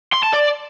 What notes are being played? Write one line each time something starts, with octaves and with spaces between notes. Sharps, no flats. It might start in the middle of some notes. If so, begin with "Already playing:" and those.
C6
A5
D5